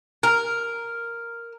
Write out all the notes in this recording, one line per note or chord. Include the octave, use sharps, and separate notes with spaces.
A#4